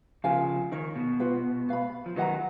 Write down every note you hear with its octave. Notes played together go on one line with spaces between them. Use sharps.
C#3 F3 A#4 F5 G#5
D#3 D#4 A#4 C#5
B2
F4 B4 F#5
B4 F5 B5
F3
D#3 F#3 B4 D#5 F#5 A#5